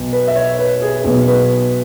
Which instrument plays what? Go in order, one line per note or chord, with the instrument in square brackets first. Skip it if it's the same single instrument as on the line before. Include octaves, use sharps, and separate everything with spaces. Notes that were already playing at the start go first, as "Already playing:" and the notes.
Already playing: [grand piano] B1 B2 B3
B4
E5
C#5
B4
G#4
B1 B2 B3 G#4
B4